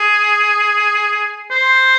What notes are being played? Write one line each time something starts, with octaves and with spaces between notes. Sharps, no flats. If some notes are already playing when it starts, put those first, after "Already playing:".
Already playing: G#4
C5